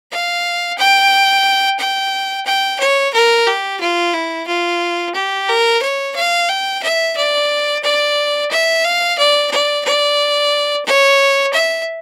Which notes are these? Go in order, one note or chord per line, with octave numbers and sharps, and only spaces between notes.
F5
G5
G5
G5
C#5
A#4
G4
F4
E4
F4
G4
A#4
C#5
F5
G5
E5
D5
D5
E5
F5
D5
D5
D5
C#5
E5